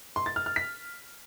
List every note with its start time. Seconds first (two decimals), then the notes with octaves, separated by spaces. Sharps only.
0.16 C6
0.26 A6
0.36 F6
0.46 F6
0.56 B6